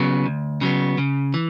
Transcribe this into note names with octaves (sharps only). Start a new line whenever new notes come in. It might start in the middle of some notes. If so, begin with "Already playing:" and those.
Already playing: C#3 F#3 B3
D2
C#3 F#3 B3
C#3
E3